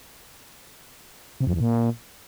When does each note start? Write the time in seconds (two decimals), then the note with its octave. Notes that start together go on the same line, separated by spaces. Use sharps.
1.41 C3
1.47 F2
1.54 E2
1.60 A#2